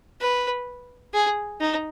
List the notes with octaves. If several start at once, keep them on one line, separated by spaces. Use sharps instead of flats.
B4
G#4
D#4